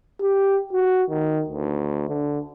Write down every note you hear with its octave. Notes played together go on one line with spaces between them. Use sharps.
G4
F#4
D#3
D2
D3